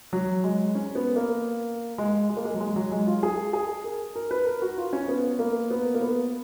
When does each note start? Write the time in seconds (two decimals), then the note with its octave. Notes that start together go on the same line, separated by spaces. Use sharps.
0.13 F#3
0.44 G#3
0.75 C#4
0.95 B3
1.16 A#3
1.98 G#3
2.29 G#3
2.37 A#3
2.45 G#3
2.54 F#3
2.61 G#3
2.76 F#3
2.92 G#3
3.07 F4
3.23 G#4
3.53 G#4
3.84 A#4
4.16 A#4
4.31 B4
4.47 A#4
4.62 F#4
4.78 F4
4.93 C#4
5.08 B3
5.39 A#3
5.70 B3
5.95 A#3
6.01 B3